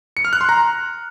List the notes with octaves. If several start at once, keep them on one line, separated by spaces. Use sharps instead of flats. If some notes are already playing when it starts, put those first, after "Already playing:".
C#7
F6
F#6
C6
A#5